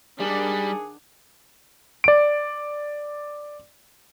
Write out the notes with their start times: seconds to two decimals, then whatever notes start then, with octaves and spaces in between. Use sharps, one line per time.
0.20 D#3 G3 D4 G#4 F#5
2.04 D5 D7